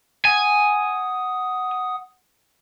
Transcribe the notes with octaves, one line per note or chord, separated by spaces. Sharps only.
F#5 G#5 D#6